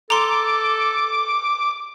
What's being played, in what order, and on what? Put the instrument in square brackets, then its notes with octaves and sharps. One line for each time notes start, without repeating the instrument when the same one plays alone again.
[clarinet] A4 [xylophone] A#5 C6 [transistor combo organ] D6